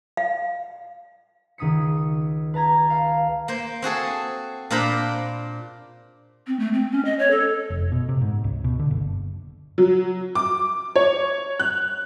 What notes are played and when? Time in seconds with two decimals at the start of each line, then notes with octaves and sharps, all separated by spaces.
0.17 F5
1.58 C#2 D#3 C#4 D#6 B6 C#7
2.54 B4 A5 A#5 G#6
2.90 F5
3.48 A#3 C5
3.82 C4 F#4 G#4 A4
4.71 A#2 D4 F4 A#4 C5 B5
6.47 C4
6.59 A3
6.73 C4
6.92 C#4
7.05 D#5
7.19 C#5
7.31 A4
7.70 F1
7.92 B2
8.09 C3
8.21 G#2
8.44 C#2
8.64 B2
8.79 D3
8.91 F#1
9.78 F#3
10.35 D6
10.96 C#5
11.60 F#6